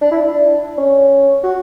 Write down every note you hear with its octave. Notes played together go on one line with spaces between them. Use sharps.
D4
E4
D4
C#4
F#4